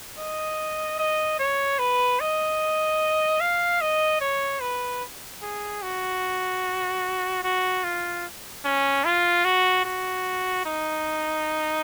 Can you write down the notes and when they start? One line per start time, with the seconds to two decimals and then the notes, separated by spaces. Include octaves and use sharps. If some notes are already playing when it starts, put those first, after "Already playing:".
0.18 D#5
0.99 D#5
1.39 C#5
1.79 B4
2.20 D#5
3.40 F5
3.81 D#5
4.21 C#5
4.61 B4
5.42 G#4
5.83 F#4
7.44 F#4
7.84 F4
8.65 C#4
9.05 F4
9.45 F#4
9.85 F#4
10.66 D#4